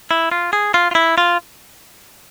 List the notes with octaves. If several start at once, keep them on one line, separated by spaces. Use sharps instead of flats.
E4
F4
G#4
F4
F4
E4
F4